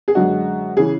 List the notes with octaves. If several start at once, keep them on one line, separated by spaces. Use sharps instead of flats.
G#4
F#2 D3 G#3 F#4
C#3 E3 G#4